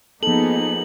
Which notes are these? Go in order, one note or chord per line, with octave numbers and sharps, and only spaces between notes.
F3 A#3 B3 D#4 G#4 A4 F#7